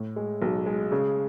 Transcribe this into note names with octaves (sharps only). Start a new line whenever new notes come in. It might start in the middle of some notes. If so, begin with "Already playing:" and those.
Already playing: A2
G#3
B1
G#3
C#3